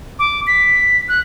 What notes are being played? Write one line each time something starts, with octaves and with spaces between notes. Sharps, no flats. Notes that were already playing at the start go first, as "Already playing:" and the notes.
D6
B6
F#6